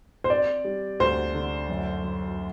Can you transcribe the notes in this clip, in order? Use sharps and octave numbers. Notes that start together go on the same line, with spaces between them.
C5
C4 D5
G3
D2 C5
D3
F#2
F#3